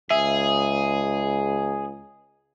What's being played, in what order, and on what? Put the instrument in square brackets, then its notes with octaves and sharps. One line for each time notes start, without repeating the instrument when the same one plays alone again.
[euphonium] C#2 [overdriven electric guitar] G#4 [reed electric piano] E5